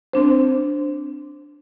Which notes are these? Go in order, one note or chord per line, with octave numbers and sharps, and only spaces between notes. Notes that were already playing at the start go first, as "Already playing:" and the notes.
C4 D4 C5